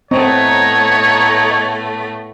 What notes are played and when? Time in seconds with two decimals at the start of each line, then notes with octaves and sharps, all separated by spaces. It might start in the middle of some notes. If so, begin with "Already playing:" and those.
0.11 A2 A3 B3 C4 C#5 D#5 A#5 C#6